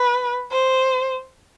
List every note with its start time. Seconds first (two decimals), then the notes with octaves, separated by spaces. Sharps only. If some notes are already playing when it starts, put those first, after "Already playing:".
Already playing: B4
0.52 C5